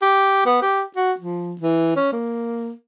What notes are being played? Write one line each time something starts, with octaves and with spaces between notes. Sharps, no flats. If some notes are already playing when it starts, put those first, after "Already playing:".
G4
B3
G4
F#4
F3
E3
C#4
A#3